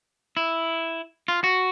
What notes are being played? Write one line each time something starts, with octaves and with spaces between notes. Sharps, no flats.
E4
F4
F#4